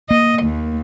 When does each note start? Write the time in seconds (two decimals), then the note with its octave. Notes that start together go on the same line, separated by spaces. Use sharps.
0.11 A#3 D#5
0.44 D#2